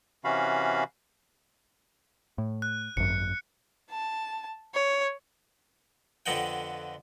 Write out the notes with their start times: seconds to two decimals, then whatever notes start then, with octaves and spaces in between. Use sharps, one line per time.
0.24 C3 E3 C#4 F#4 F5 B5
2.38 A2
2.62 F#6
2.97 G#1 F#2 C#7
3.91 A5
4.74 C#5
6.26 F2 D3 B3 D#5 F#5 G5